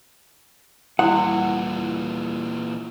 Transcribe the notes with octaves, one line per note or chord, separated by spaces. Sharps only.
D#2 A#2 E3 G3 E4 F#4 F#5 D#6